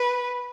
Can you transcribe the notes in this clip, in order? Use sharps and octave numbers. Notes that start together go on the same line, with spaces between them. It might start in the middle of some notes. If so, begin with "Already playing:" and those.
Already playing: B4